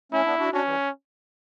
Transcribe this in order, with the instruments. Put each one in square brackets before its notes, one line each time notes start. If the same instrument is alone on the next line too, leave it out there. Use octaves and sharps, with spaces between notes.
[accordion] A3 C#4 [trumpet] E4
[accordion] B3 D4
D4 F#4
[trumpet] C#4 [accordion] D4 F#4
[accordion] E3 G3